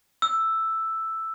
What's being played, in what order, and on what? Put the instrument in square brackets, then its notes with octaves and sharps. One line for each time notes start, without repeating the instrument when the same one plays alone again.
[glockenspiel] E6